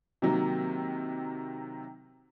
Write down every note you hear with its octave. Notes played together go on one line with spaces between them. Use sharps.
C3 D#3 F#3 A#3